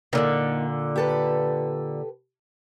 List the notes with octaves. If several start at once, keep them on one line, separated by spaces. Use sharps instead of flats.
A#2 D3 D#3 A#3 D#4
G4 A4 B4